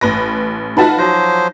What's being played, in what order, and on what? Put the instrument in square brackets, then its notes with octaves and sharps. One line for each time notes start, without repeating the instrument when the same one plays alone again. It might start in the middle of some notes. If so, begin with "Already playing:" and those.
[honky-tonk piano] A1 B4 A#6
[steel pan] D#4 A5 B5 [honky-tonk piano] F4 F#4 B4
[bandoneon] F3 F#3 C5 [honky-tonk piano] A#6